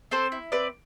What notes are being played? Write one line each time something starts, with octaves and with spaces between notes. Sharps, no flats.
C4 A4 C5
E4
C4 B4 D5